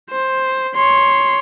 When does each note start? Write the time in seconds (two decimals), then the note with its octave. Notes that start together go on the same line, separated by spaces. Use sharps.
0.11 C5
0.75 C#5 C6